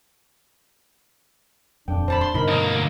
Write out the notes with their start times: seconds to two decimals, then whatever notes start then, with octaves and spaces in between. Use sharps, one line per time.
1.88 D#1 F2 D4 G5
2.08 C5 A5 B5
2.21 C6
2.34 G2 B2 D3 D#4 A#4 B5
2.48 D2 A#3 D#5 A#5